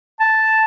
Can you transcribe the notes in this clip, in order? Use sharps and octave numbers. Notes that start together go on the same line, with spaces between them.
A5